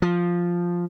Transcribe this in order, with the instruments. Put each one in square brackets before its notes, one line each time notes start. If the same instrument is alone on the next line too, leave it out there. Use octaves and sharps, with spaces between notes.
[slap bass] F3